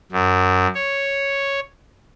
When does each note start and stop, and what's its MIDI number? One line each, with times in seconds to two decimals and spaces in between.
0.12 0.67 42
0.75 1.60 73